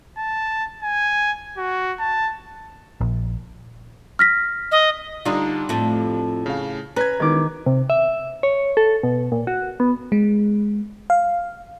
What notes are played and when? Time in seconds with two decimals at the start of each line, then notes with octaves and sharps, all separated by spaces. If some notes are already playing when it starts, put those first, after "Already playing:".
0.18 A5
0.83 G#5
1.57 F#4
1.99 A5
3.01 A#1
4.19 F6 A#6 B6
4.72 D#5
5.25 D3 G3 D4 D#4 F4 C6
5.69 F2 A2 A3
6.46 C#3 F5
6.96 C#4 B4 A#5 G#6
7.20 E1 D#3 D6
7.66 C3
7.90 E5
8.43 C#5
8.77 A4
9.03 B2
9.32 A#2
9.47 F#4
9.80 B3
10.12 G#3
11.10 F5